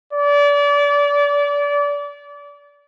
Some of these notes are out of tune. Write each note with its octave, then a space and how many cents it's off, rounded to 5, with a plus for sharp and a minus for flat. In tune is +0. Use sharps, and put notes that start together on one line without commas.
D5 -30